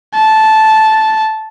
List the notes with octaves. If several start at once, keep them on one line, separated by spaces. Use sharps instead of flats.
A5